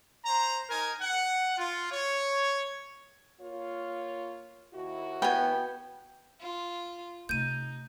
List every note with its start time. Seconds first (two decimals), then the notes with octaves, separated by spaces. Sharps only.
0.25 C5 A#5
0.69 D#4 A#4 G#5
1.00 F#5
1.57 F4
1.91 C#5
3.41 A#3 F4 C#5
4.74 D#2 E4 F#4
5.22 B3 G5 G#5
6.41 F4
7.29 C3 A3 D#4 G6 D#7